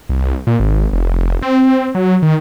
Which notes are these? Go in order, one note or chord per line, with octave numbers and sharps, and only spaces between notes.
C2
A#2
G#1
F1
C4
F#3
D#3